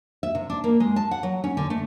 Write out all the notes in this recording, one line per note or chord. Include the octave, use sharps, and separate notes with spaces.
E5
C3
D4
A#3
G#3
A5
F#5
F#3
C#4
D3
A3